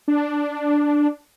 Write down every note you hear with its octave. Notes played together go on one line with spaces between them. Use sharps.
D4